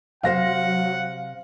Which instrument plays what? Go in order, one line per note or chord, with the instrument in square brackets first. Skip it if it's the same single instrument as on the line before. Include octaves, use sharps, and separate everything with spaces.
[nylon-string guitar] C3 C5 [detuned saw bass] F#3 [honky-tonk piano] F5 A#6 [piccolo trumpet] F#5